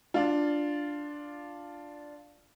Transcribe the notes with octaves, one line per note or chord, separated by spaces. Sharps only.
D4 F4